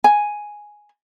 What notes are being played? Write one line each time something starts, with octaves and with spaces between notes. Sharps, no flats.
G#5